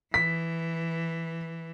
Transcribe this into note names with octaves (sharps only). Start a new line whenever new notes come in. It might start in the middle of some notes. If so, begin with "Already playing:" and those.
E3 B6